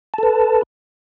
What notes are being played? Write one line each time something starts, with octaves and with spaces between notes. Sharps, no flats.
A4 B4 A5